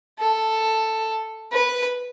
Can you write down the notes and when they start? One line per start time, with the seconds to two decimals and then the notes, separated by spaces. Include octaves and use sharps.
0.19 A4
1.52 B4